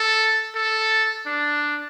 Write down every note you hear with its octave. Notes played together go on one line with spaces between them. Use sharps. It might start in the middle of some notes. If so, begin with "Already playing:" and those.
Already playing: A4
A4
D4